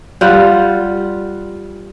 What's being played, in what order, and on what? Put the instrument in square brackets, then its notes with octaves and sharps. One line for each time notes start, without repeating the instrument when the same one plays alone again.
[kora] G3 F4 F#5